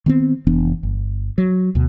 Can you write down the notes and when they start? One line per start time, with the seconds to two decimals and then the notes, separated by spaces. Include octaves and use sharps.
0.06 D#3 B3 C4
0.47 F1 E3 B3 D4
0.83 G1
1.38 F#3
1.75 D2 B2